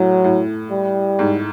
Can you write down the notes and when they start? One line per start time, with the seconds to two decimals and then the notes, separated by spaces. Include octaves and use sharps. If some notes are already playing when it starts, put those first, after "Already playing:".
Already playing: A2 F#3
0.24 A2
0.71 G3
1.19 G#2